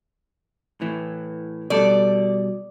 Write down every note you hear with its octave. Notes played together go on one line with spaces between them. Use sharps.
A2 E3
B2 G3 A4 D5